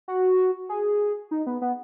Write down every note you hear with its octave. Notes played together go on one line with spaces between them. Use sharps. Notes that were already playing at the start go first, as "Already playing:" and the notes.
F#4
G#4
D#4
B3
B3